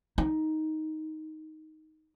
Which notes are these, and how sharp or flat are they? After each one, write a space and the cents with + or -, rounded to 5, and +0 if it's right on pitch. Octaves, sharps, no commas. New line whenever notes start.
D#4 +5